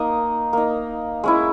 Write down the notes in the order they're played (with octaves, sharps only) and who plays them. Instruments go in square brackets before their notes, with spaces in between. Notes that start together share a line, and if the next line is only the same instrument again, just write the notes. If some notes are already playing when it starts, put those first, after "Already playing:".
Already playing: [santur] A#3 D#4 D#6
A#3 D#4
G#3 C#4 E4